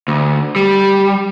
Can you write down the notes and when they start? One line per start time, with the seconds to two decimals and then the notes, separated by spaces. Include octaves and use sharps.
0.08 D2
0.56 G3